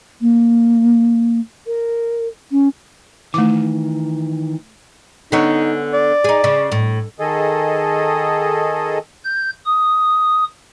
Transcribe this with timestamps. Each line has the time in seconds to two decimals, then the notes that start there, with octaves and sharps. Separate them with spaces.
0.21 A#3
1.66 A#4
2.51 C#4
3.34 D#3 E3 A3 D6
5.32 D3 B3 C#4 D#4
5.93 D5
6.24 D#4 G#4
6.44 C#3
6.72 A2
7.20 D#3 G#4 A4 D#5
9.25 G6
9.66 D#6